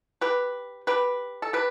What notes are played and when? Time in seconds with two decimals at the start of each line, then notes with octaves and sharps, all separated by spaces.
0.21 G4 B4
0.87 G4 B4
1.42 A4
1.53 G4 B4